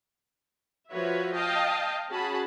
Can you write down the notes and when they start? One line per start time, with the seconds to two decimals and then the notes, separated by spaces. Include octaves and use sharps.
0.90 F3 F#4 B4 C#5 E5
1.35 D#5 F5 G5 A5
2.10 C#4 F#4 G#4 A5 B5